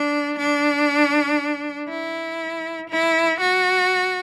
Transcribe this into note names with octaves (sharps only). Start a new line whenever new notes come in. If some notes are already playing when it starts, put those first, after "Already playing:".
Already playing: D4
D4
E4
E4
F#4